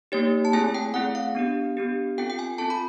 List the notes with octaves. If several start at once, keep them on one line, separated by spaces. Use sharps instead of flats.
A#3 D#4 G4 C#5
A5
A3 C4 E4 G#4 G#5
G5
A3 C4 E4 G#4 F#5
F5
B3 D4 G4
B3 D4 G4
C4 F4 A4 G5
G5
G#5
C4 F4 A4 A5
B5